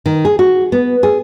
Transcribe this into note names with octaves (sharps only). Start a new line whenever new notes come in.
D#3
G#4
F#4
B3
G#4